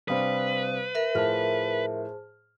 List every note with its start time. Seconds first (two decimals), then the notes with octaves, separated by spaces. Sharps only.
0.08 C3 G3 D4 B4 C5 F5 D#6
0.95 A#4 E5
1.15 A2 F3 G#4 C5 A5 F6